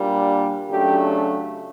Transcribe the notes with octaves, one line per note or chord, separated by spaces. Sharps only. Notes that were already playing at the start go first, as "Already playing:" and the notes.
Already playing: A#2 G3 A#3 D4
C#3 F#3 A3 D4 G4